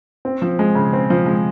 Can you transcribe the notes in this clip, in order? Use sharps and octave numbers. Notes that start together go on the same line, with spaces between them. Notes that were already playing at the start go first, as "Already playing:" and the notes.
C4
F3
G#3
C#3
C4
F3
G#3